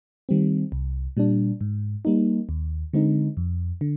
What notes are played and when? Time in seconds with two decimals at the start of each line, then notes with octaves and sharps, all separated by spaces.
0.29 D#3 G3 C4
0.72 C2
1.17 A#2 G3 D4
1.61 G#2
2.05 G3 A#3 D#4
2.49 D#2
2.93 D3 G#3 C4 D#4
3.37 F2
3.81 D3